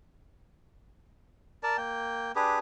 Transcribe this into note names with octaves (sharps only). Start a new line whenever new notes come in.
A#4 D5 A5
A#3 G5
D4 G4 G#4 B4